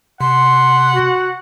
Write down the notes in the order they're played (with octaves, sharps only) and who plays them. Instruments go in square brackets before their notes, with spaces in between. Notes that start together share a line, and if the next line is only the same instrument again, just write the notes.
[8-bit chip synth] C3 [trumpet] F#5 [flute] C6
[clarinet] F#4